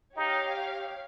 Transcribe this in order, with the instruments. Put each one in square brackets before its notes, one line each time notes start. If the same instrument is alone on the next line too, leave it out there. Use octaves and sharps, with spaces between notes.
[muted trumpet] D#4 [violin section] G4 C#5 F5